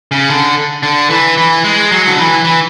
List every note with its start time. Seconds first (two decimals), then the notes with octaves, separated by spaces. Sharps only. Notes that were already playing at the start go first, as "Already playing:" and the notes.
0.11 C#3
0.30 D3
0.83 D3
1.10 E3
1.38 E3
1.64 G#3
1.91 F#3
2.07 D3
2.18 E3
2.44 E3